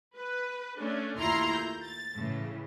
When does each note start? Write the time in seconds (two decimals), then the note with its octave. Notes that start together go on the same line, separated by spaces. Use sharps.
0.14 B4
0.78 A3 C#4 D4
1.16 D#2 A3 E4 F4 A#5 C6
1.52 G6
1.84 A6
2.15 A2 C#3 E3